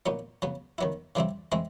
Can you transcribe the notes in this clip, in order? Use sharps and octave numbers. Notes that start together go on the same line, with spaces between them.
A#2 F#3 B3 D#4
C#3 F#3 B3
D#3 F#3 B3 E4
C#3 E3 G3 C4 E4
E3 G#3 C4 E4